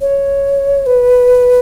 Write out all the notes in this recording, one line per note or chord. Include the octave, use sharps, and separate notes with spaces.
C#5
B4